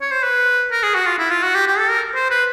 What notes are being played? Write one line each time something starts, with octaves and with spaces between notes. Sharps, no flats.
C#5
C5
B4
A#4
G#4
F#4
F4
E4
F4
F#4
G4
G4
A4
A#4
C5
B4